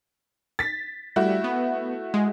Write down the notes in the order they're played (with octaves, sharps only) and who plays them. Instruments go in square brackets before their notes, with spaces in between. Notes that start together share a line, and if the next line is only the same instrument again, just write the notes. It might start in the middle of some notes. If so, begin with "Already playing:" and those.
[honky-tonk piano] A6 B6
[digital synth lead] G3 [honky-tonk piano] A3 E4 F#4
[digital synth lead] B3
G#3